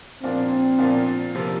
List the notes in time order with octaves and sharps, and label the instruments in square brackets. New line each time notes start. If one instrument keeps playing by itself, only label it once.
[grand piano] A#2 F3 A#3 D4 [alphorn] C4
[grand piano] A#2 F3 A#3 D4
C3 F3 A#3